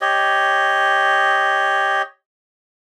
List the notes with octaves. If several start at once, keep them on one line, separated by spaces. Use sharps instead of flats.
G4 C#5 D#5